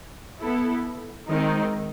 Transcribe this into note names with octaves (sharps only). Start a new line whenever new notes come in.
B3 E4 A4
D#3 G#3 C4 D#4